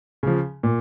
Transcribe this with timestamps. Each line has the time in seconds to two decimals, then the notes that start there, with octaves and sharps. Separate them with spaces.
0.23 C#3 F3
0.63 A#2